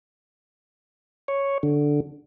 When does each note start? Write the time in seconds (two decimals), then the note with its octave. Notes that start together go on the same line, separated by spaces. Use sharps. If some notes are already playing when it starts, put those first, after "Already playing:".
1.28 C#5
1.63 D3